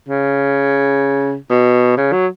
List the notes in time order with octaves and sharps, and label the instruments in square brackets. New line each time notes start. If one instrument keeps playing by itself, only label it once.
[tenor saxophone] C#3
B2
C#3
F#3